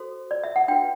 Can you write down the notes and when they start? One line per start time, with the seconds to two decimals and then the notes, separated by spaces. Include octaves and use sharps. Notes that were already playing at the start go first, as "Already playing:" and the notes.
Already playing: F#4 A4 C5
0.31 D5
0.44 E5
0.56 F#5
0.68 D4 F#4 B4 G5